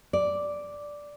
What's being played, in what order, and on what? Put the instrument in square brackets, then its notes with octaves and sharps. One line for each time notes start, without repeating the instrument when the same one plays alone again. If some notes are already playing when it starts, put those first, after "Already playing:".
[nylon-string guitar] D5